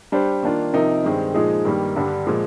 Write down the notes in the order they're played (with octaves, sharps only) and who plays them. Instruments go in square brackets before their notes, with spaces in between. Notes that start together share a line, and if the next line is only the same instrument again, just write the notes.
[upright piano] G3 D4 G4 C5
D#3 A#3 D4 F4
C3 F3 C4 D#4 A#4
G2 D#3 G#3 C4
A#2 F3 G#3 D#4 G#4
G2 D#3 G3 A#3
G2 D3 G3 D4
A#2 F3 G#3